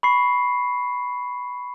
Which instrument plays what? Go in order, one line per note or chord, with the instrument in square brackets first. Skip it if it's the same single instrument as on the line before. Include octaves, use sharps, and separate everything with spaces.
[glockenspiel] B5 C#6 C7